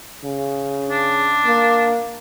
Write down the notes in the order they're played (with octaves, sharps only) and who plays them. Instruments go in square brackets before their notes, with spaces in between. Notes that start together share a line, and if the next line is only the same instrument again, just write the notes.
[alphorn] C#3
[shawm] D4
[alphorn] A#3